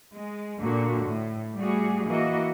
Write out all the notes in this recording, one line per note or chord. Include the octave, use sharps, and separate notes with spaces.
G#3
A#2 D3 F#4
A2
G3 A3 F#4 G#4
E3 A#3 F#4 D#5